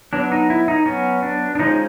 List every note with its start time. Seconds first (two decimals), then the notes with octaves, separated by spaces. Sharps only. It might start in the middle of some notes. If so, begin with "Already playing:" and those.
0.13 F#3 B3 D4
0.32 D#4
0.50 E4
0.68 D#4
0.86 F#3 B3 C#4
1.23 D4
1.55 D4
1.59 F3 G#3 C#4 D#4